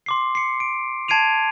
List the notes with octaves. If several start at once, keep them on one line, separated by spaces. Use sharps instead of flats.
C6 D6 C7
C7 C#7
D7
A5 G#6 C7 D7 D#7 F7